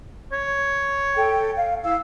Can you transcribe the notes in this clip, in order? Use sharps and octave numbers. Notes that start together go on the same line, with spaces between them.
C#5
A4 G5
F5
E4 F5 E6